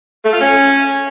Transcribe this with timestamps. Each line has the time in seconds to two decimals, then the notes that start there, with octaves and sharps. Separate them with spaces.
0.24 A3
0.32 F4
0.40 C#4